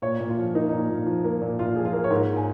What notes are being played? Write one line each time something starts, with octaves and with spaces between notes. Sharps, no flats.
A#2 C#5
A#2
F4
F3
A#3 D#4
A#2 D#4
A#2
F3
A#3
A#2
A#2 F4
F3 G#4
F4
A#3
C#5
G#2 A#4
G#5